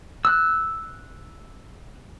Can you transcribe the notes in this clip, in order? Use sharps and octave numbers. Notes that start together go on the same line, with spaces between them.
E6 F#6